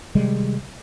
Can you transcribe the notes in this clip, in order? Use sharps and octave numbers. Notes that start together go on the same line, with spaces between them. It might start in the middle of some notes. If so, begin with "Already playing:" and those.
C3 D#3 G3 G#3